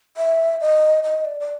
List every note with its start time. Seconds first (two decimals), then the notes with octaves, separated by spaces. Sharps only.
0.17 E5
0.61 D#5
1.04 D#5
1.25 D5
1.40 D5